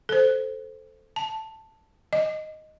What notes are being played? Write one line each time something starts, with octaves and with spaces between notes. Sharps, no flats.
A4 C5
A5
D#5